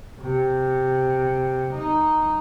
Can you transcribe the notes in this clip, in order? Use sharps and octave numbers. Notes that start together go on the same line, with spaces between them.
C3
D#4